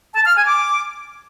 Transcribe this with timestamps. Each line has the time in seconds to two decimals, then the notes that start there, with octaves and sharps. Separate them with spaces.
0.15 A5
0.25 F6
0.36 G#5
0.47 D6